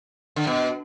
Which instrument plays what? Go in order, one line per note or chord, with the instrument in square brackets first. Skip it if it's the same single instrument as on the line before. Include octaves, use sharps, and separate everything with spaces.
[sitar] D3
B2